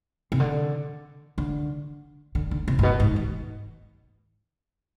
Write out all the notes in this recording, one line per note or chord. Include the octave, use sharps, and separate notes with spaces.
C3
D3
D3
D3
D3
C3
G#2
B2
G#2
D#3